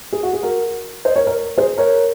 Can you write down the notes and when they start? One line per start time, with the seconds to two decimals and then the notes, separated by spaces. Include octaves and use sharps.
0.13 G#4
0.23 F#4
0.33 G#4
0.43 F#4 A#4
1.05 C5 D#5
1.16 A#4 C#5
1.27 A#4 C#5
1.58 G#4 C5
1.78 A#4 C#5